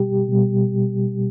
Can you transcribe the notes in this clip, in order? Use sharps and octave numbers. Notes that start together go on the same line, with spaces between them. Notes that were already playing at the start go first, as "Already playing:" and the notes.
Already playing: B2 G3 G4
B2 G3